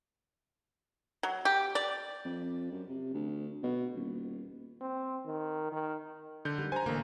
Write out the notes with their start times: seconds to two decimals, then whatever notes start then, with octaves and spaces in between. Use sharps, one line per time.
1.23 F#3
1.45 G4
1.75 D5
2.25 F2
2.72 F#2
2.89 C3
3.14 D2
3.63 B2
3.95 D#1
4.81 C4
5.26 D#3
5.72 D#3
6.45 D3 G6
6.58 G3 A#3 D#4
6.72 C5 G#5 A#5
6.86 A1 D3 A#3